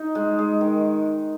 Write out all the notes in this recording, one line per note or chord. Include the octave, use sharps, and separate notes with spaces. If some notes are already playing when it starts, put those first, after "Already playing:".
Already playing: D#4
G#3
G#3
D#3